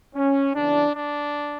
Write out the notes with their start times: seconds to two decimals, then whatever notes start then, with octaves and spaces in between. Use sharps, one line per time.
0.15 C#4
0.55 E2 C#3 E3 D4
0.95 D4